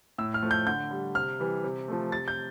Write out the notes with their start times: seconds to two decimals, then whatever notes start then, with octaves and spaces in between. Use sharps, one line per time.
0.18 A2 E6
0.34 F6
0.42 F3 A3
0.51 G6
0.67 D3 G6
0.91 G3
1.15 C3 F6
1.39 E3 G3
1.64 C3
1.88 F3 A3
2.11 C3 A6
2.28 G6